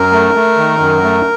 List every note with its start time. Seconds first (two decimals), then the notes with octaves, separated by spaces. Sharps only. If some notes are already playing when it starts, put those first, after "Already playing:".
Already playing: F#2 A#4
0.12 A3
0.35 A3
0.57 D#3
0.80 F#2
1.03 A3